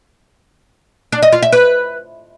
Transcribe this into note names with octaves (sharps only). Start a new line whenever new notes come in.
D4
D#5
F4
E5
B4